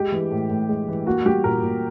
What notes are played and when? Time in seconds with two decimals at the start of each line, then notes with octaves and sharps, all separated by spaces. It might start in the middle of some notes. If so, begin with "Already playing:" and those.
Already playing: G#3 G4
0.12 E3
0.31 A2
0.50 A2
0.69 G#3
0.88 E3
1.06 A#3 F#4
1.25 G3 G4
1.44 A#2 A#4
1.63 A#2